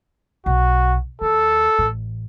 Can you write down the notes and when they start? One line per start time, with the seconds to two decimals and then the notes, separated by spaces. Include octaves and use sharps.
0.46 B1 F#4
1.21 D#2 A4
1.79 A1